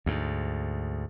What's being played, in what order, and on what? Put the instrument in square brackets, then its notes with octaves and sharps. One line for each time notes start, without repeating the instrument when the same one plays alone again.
[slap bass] D2 G#2